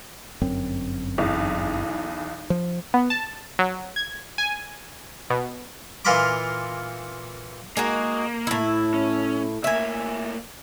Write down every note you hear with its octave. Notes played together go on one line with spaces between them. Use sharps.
G1 F#2 C4
B1 E2
F3
B3
A5
F#3
G#6
G#5
B2
A#2 E3 F4 A#5 B5 D6
G#3 A#3 D#4 F#4
A2 E4
C#4
A2 A#3 E5 G#5